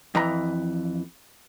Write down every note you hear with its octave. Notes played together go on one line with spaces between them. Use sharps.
F2 E3 A#5